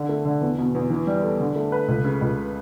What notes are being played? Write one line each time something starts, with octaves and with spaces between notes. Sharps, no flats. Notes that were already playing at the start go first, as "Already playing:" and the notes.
Already playing: D3
A3
D3
E2
B2
E2
E3
G3
A4
D3
A3
B4
C#2
C#3
C#2